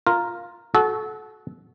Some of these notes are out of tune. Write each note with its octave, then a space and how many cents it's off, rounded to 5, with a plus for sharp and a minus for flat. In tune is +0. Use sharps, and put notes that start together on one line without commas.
F4 +0 A#4 +0
F#4 +0 A4 -30